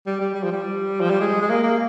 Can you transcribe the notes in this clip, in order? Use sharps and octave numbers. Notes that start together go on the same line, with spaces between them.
G3
G3
G3
F3
G3
F3
G3
G#3
G#3
A#3
A#3